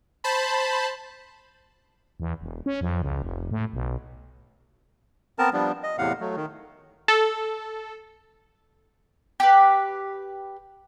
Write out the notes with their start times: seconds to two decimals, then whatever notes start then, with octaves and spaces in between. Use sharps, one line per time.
0.24 C5 A5 B5
2.20 E2
2.41 E1
2.66 C#4
2.81 F2
3.02 C#2
3.22 F1
3.51 A2
3.73 B1
5.39 B3 C4 A#4 A5
5.53 F3 G3 B3 D4
5.83 D#5
5.98 E2 A2 C3 F5 F#5
6.20 F#3 A3
6.36 D#3
7.08 A4
9.40 G4 B4